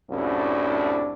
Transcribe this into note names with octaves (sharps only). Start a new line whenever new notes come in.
C2 F#2 A2 D4